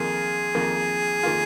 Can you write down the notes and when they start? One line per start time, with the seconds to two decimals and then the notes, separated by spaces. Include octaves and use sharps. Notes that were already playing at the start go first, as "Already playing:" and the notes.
Already playing: F2 D#3 A#3 F4 G#4
0.55 F2 D#3 A#3 F4
1.23 D#3 A#3 F4